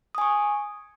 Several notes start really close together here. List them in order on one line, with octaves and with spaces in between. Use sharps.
D#6 G#5 C#6